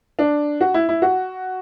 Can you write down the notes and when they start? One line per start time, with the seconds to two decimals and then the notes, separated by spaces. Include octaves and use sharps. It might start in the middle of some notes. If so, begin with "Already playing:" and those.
0.19 D4
0.61 F#4
0.74 E4
0.89 E4
1.02 F#4